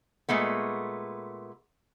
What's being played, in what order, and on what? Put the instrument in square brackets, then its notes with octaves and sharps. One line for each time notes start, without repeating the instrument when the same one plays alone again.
[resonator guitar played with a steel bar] A#2 G#3 A3 B3